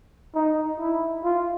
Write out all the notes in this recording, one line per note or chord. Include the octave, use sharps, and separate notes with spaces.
D#4
E4
F4